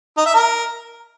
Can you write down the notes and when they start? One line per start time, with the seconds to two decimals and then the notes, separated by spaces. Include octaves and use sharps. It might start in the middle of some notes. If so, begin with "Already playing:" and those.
0.18 D#4
0.26 E5
0.35 A#4